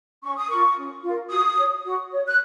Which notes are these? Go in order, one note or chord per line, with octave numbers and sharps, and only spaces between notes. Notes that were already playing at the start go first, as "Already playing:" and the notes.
C#4 C#6
D#6
F4 A#4 C#6
C#4
F4 A#4
F#4 D#6
C#5
F#4
C#5
F#6